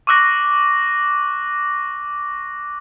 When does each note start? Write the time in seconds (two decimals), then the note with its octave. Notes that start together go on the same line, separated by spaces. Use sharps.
0.07 C#6 D6 E6 F#6 A#6